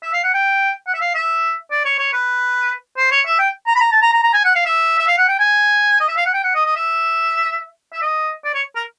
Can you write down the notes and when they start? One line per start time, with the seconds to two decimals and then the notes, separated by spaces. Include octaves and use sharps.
0.03 E5
0.13 F5
0.24 F#5
0.34 G5
0.87 F#5
0.94 E5
1.01 F5
1.15 E5
1.71 D5
1.85 C#5
1.98 C#5
2.13 B4
2.97 C5
3.11 C#5
3.26 E5
3.39 G5
3.67 A#5
3.75 B5
3.81 A#5
3.92 A5
4.02 A#5
4.13 A#5
4.23 A#5
4.33 G#5
4.44 F#5
4.55 F5
4.65 E5
4.99 E5
5.07 F5
5.18 F#5
5.28 G5
5.39 G#5
6.00 D#5
6.08 E5
6.17 F5
6.26 F#5
6.34 G5
6.43 F#5
6.55 D#5
6.65 D#5
6.76 E5
7.93 E5
8.02 D#5
8.44 D5
8.54 C#5
8.76 A#4